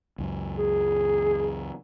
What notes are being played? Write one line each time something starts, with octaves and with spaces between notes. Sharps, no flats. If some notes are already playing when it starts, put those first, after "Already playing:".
C#2 F#2
G#4